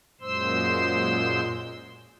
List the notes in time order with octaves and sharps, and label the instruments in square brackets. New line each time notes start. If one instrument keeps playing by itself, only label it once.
[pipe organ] F#2 A#2 G#3 C5 C6 E6